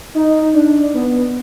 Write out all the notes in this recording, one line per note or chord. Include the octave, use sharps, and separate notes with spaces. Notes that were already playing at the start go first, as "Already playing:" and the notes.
D#4
D4
B3